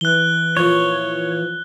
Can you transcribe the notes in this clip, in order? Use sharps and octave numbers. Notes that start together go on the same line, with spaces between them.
E3 F#6 G7
A#2 F3 C#5